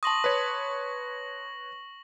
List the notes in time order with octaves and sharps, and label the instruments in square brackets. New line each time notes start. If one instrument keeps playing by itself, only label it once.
[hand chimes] A5 C6 D#6 [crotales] C#6 A#6 F#7
[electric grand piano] B4 C#5